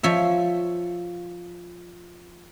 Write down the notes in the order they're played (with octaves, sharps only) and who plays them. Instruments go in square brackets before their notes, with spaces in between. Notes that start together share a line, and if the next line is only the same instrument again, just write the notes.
[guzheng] F3 C#5 E5